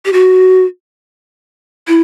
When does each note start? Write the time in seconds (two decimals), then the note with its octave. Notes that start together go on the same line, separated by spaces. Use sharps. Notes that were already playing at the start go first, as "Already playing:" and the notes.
0.05 G4
0.13 F#4
1.88 E4